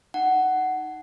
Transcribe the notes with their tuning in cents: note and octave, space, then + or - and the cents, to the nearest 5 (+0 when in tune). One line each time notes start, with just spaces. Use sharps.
D#4 +0 F#5 +10